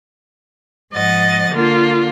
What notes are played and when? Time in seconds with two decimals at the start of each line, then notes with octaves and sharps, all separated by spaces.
0.92 G#2 F3 D#5 F#5 A6
1.50 D3 A#3 F4